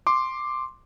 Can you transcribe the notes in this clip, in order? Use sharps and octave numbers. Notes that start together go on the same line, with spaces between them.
C6 D6